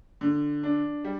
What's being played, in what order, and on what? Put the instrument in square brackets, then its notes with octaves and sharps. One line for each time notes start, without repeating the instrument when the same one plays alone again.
[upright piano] D3
D4
G3